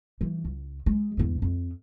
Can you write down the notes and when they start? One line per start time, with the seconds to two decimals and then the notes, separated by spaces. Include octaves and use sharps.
0.21 E3 G3
0.44 C#2
0.86 G#3
1.17 E2 G2
1.42 F2